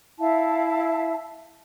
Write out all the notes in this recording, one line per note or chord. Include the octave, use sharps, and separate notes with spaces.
E4 E5 F5 A5